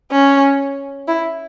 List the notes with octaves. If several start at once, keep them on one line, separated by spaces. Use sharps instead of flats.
C#4
E4